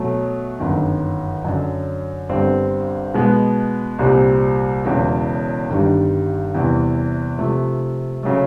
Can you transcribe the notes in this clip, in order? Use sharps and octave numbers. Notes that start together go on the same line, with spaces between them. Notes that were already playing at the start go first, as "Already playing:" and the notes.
Already playing: B2 F#3 A3
G1 F#2 D#3
F#2 D3 F#3
G1 G2 D3 G3 C4
B2 G#3 B3
C2 A#2 G3 C4
E1 E2 C#3 F#3
G1 G2 D#3 G3
E2 C3 E3 G3
C3 F3 A3
C#3 F#3 A3